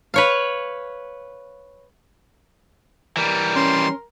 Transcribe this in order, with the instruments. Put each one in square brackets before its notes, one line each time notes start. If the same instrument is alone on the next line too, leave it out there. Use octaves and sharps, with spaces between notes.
[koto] B4 C#5 F5
[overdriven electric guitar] E3 G3 [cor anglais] A#4
[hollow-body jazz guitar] C#4 [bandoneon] C6